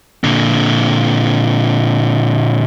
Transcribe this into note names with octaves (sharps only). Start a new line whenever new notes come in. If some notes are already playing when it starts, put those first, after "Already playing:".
A#2 D3